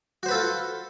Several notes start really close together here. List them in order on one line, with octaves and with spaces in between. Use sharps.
F#4 C5 B4 A4 F4